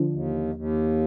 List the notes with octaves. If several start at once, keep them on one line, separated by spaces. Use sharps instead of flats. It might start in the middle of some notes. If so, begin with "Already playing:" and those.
Already playing: D3 F3
D#2
D#2